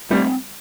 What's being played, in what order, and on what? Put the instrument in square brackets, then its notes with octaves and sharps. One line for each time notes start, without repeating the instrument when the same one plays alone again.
[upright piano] G3 [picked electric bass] A3 C4